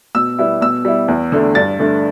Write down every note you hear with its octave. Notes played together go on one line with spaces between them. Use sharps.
B2 E6
G3 B3 E4
B2 E6
G3 E4
E2
D3 A3 D4
G2 A6
D3 A3 D4